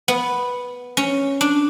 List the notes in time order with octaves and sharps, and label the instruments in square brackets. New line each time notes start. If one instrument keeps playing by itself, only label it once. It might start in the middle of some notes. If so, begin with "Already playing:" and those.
[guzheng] B3
C#4
D4